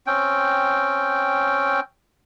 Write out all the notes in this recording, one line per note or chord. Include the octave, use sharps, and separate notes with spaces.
C4 C#4 G5